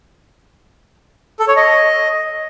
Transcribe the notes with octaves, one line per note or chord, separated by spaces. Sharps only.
A4
C#5
D#5